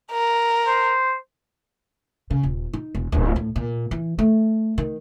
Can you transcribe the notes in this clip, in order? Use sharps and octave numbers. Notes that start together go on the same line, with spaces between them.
A#4
C5
C#3
D#1
D#4
E1
D1
A2
A#2
E3
A3
D#3